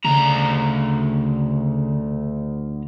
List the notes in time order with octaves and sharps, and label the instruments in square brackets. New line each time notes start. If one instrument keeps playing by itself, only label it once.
[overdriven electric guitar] D2 A#5 [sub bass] C#3